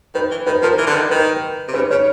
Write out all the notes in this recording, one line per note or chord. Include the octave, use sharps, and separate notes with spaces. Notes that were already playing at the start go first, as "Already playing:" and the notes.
D#3 B4
E3
D#3 B4
F3 A#4
E3
D3
D#3
D#3 B4
C3
C#3 B4
C#3 C#5